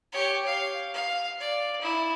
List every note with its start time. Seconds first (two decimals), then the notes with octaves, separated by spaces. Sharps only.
0.12 G4 C#5
0.45 F5
0.94 F5
1.40 D5
1.81 E4